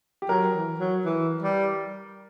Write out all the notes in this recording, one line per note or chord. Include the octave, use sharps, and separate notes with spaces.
G4
F#3 A#4
E3
F#3
E3
G3